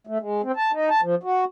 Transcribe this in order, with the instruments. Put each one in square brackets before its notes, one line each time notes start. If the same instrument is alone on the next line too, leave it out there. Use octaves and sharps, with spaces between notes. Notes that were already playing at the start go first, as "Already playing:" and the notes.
[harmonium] A3
G#3
C4
A5
D#4
A5
F3
F#4